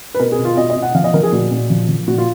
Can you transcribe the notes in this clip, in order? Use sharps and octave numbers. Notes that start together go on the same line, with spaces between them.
B4
B2 A#4
G#4
B2
F4
B2 D#5
D#5
B2
F#5
F3 F5
D#5
F3 A#4
G#4
A#2 F#4
A#2
F3
F3
A#2 F#4
F4